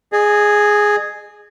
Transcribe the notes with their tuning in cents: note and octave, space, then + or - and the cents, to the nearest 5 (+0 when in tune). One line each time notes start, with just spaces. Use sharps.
G#4 +0 D#5 -35